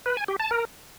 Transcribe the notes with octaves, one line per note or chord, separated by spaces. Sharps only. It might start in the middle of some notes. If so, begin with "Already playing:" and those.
B4
G#5
G4
A5
A#4